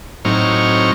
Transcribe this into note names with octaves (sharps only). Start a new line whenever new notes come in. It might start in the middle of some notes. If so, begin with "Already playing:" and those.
A2 F#3 C4 D#4 C#6 F6